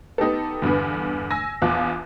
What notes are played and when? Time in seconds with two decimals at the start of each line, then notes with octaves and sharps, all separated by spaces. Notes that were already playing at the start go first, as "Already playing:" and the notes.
0.18 B3 D#4 G4 A4
0.62 E2 G2 D3 B3
1.31 G#5 E6 A#6
1.62 A#1 E2 F4 A5 D6 F#6